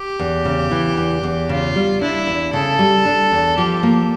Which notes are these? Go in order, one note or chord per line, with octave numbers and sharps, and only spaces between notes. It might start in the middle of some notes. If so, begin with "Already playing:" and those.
Already playing: G4
E2
C#3
E3
E2
E2
C#3 F4
G3
D4 E4
E2
C#3 A4
G3
D4
E2
F3 G4
A#3